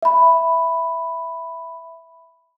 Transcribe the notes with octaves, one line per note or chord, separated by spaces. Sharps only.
E5 B5